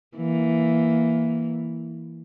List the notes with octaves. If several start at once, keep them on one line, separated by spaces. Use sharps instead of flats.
E3 A#3